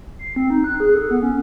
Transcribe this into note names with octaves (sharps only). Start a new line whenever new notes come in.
C7
C4
D#4
F#6
G#4
A4
B3
C#4